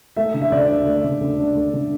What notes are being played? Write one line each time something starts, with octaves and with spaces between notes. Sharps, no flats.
A3 E5
D3
E5
D2 D5
D4
A3
D3
D2
D4
A3
D3